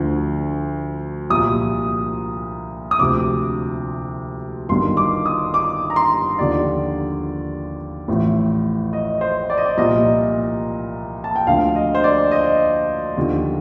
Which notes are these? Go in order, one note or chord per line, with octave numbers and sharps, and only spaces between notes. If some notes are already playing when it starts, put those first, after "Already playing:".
Already playing: D2 D3 F3
C2 A#2 F3 D#6
D#6
D2 C3 F3 D6
G1 G2 D#3 C6
D6
D#6
D6
A#5
C6
D#2 D3 F3 D5
A1 A2 F3
D#5
C5
D5
D#5
D5
C2 A#2 F3 D#5
A5
G5
D2 D3 F3 F5
D#5
C5
D5
D#5
D#2 D3 F3